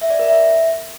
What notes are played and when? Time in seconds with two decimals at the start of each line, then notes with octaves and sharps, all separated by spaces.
0.01 E5
0.10 D5
0.19 A#4
0.28 E5